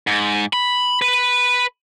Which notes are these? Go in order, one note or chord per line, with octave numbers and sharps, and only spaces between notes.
G#2
B5
B4